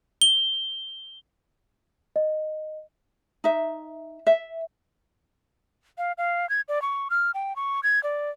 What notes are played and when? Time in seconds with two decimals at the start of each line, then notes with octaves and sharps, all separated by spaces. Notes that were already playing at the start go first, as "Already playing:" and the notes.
0.22 G7
2.16 D#5
3.44 D#4 E5
4.27 E5
5.98 F5
6.18 F5
6.49 G#6
6.68 D5
6.82 C#6
7.10 F6
7.34 G5
7.56 C#6
7.83 G#6
8.03 D5